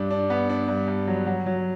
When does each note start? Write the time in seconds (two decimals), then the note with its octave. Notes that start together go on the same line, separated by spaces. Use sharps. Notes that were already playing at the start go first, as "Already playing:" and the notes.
Already playing: G2 D4
0.10 D4
0.30 B3
0.49 D4
0.68 G2
0.88 G2
1.07 F#3
1.26 F#3
1.46 F#3